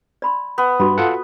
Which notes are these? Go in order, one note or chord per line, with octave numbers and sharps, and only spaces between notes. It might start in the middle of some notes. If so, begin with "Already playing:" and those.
D5 B5 C6
B3
G2 F#4 B5
F4 A4 F#5